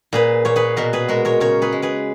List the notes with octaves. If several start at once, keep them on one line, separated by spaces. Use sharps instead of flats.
A#2 G#4 B4
A#2 C#5
G#4 B4
B2 F#4 A#4
G#4 B4
G#3 F#4 A#4
A#4 C#5
C#3 A#4 C#5
G#4 B4
G#3
G#4 B4